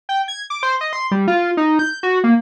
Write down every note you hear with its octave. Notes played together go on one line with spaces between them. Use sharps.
G5
G#6
D6
C5
D#5
C6
G3
F4
D#4
G6
F#4
A#3